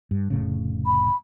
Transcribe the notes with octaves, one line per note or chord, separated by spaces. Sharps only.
G2
F1 A2 C#3
B5